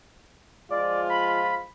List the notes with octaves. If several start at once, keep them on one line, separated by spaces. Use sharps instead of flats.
F3 G#3 F4 D5
B5